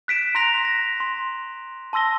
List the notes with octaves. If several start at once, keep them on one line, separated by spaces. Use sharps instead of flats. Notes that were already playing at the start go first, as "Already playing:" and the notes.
F#6 B6 D7 E7
A#5 C6 F#6 A#6 B6 F7
A#6
C6
A5 C6 E6 A#6 G7